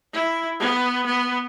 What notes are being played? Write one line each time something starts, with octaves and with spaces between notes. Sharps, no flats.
E4
B3
B3